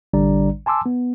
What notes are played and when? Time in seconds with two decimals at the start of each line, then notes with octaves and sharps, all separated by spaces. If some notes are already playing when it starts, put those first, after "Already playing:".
0.13 A1 D3 G3 D4 D5 A#5
0.66 G#5 A5 C6 D6 E6
0.86 B3